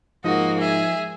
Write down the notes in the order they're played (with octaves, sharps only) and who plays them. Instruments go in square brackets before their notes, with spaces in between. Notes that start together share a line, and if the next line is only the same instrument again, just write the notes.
[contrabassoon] G#2 [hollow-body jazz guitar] F3 [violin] A#3 F#4 [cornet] D#5
[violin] G#4 [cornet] E5